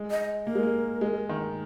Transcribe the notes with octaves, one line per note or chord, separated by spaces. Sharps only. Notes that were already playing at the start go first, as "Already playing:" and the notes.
Already playing: G#3
D#5
A#3 A#4
G#3
A#3
G#3
D#3